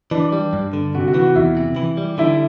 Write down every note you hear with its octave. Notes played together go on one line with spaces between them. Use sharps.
E3 D4
G3
G2
D3
C3 F#4
F#4
E3
F#4
E2 E4
C3
E3
G3
D3 E4